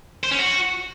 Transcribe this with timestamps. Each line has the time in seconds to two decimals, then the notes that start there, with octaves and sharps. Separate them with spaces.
0.24 C5
0.31 C#4
0.39 F#4